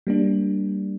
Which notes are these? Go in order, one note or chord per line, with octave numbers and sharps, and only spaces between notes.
G3 A#3 D4